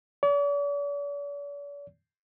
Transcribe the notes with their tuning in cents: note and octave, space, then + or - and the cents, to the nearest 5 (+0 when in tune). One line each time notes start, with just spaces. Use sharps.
D5 -45